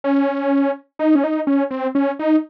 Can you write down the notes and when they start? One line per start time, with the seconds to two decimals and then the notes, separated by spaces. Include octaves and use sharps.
0.04 C#4
0.99 D#4
1.15 C#4
1.24 D#4
1.47 C#4
1.71 C4
1.95 C#4
2.19 D#4